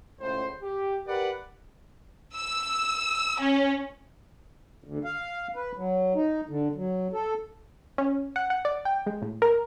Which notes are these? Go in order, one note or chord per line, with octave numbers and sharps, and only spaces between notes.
C#2 A2 C5
G4
G4 A#4 B4 D5 F#5
E6
C#4
D2
F5
B4
F#3
D#4
D3
F#3
A4
C#4
F#5
F#5
D5
G5
G#3
A2
A#4